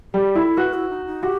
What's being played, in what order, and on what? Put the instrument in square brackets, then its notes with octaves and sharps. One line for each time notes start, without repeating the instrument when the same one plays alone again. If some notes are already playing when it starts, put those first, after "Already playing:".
[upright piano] G3 [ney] G4
[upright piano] E4 [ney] A4
[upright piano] F#4 [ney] B4
[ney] E4
D#4
D#4
[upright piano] F#4 [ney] G4